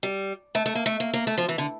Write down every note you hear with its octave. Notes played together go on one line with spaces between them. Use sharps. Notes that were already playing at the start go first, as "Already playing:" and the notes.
G3
A3
A3
A#3
A3
A#3
A#3
A3
F3
E3
D3